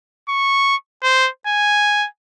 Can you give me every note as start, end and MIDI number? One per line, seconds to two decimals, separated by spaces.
0.29 0.76 85
1.03 1.30 72
1.47 2.07 80